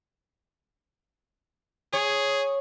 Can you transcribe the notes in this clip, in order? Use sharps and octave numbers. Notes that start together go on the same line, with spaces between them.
G#4 C#5